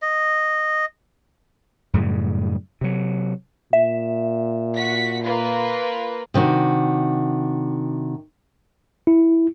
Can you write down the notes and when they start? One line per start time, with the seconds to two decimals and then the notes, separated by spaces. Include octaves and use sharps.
0.02 D#5
1.94 F#2 A2 C#3 G3
2.81 C3 F#3
3.73 A#2 E5
4.77 F#4 B6
5.24 A#3 F4 B4
6.34 C3 D#3 D4 F#4
9.07 E4